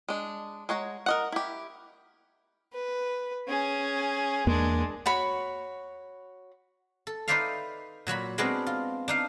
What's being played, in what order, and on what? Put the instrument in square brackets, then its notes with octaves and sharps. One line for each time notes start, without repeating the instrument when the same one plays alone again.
[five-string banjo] G#3 D4
G#3 C#5 F#5 A#5
A#4 D#5 F#5
E4 G4
[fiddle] B4
C#4 G#4
[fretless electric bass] E2 A#3 [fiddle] G#3 D4
[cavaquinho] F#4 C#5 B5
[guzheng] A4
D#4 B4 C5 D5 E5 F5
A#2 F#3 F#4 B5
G#3 B3 C4 D4 F#4 A#4
F4
D4 D#4 F5